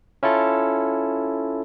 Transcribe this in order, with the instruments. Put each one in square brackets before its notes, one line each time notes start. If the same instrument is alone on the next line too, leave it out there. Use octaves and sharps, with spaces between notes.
[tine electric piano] C#4 E4 F4 A4